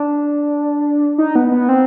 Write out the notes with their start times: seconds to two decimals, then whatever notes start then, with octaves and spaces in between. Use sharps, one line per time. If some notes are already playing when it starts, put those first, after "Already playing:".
Already playing: D4
1.18 D#4
1.35 B3
1.51 B3
1.69 C4